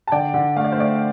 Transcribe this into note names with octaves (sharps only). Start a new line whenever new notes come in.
A5
D3 D5 G5
D3
A3 F5
D5
C5
A3 D5